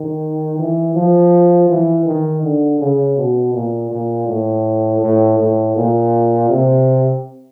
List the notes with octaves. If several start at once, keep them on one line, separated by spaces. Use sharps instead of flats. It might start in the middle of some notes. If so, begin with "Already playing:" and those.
Already playing: D#3
E3
F3
E3
D#3
D3
C#3
B2
A#2
A#2
A2
A2
A2
A#2
C3